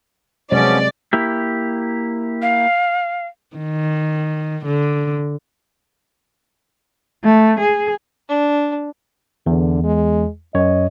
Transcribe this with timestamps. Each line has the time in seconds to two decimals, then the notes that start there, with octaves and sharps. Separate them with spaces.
0.52 C3 F3 F#3 G#3 B3 C#4 D5
1.13 A#3 E4 G4
2.42 F5
3.56 D#3
4.65 D3
7.24 A3
7.60 G#4
8.29 D4
9.46 E2 D3
9.84 G#3
10.55 F#2 C#5 D#5